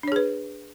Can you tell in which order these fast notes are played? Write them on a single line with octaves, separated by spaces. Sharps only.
D4 C#5 G#4 B4